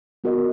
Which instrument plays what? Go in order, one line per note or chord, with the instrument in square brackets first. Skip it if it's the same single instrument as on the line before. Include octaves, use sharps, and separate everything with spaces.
[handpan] B3 F#4 A#4 D#5